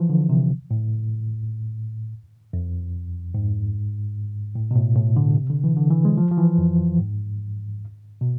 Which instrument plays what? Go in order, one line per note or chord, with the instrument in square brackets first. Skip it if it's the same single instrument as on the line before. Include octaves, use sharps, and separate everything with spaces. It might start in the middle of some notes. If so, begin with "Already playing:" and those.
Already playing: [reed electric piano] E3 F3
D3
C3
A2
F2
G#2
A2
B2
A2
A2
D3
C3
D3
E3
D3
E3
G#3
F3
F3
E3
F2
G#2
B2